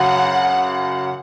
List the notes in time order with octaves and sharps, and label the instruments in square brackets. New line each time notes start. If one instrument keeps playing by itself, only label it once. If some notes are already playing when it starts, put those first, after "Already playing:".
Already playing: [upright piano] F#2 C#3 F#3 [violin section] F#5